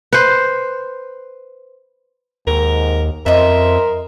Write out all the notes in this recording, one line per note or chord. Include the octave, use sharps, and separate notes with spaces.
B4 C5
D#2 G#2 A#4
F2 A#4 C5 D#5 E5